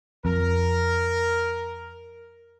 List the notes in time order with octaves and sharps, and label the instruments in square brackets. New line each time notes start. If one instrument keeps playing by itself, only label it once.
[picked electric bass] F2 [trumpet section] A#4